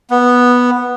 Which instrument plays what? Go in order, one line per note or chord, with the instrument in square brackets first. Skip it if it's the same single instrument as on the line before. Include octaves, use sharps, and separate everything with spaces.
[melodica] B3